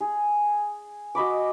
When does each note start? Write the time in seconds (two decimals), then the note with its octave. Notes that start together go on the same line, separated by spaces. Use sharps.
0.01 G#4
1.15 F#4 D#5 B5 D6